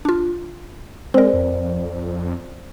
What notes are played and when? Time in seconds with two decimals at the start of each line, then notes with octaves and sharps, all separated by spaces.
0.05 D4 F4
1.14 G#3 C4 A#4 C5 D5
1.33 F2